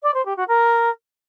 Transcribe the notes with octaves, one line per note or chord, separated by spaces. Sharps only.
D5
C5
G4
F#4
A#4